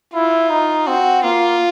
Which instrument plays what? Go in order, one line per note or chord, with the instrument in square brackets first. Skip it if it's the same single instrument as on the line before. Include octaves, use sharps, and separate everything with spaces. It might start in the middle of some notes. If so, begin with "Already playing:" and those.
[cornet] E4 [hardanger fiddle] F4
[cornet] D#4
[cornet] C4 [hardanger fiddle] F#4
[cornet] A#3 [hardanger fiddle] F4